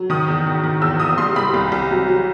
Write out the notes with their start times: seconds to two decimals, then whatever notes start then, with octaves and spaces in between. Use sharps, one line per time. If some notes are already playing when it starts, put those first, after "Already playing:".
Already playing: F#3
0.10 D#3 D#6
0.28 E2
0.46 D#3
0.64 D#3
0.82 E2 E6
1.00 E2 D#6
1.18 G3 C6
1.36 G3 B5
1.54 C2
1.72 C2
1.91 F#3
2.08 F#3